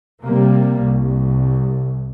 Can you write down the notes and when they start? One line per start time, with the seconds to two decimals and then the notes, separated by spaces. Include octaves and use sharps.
0.24 C3 G3 A#3
0.82 C2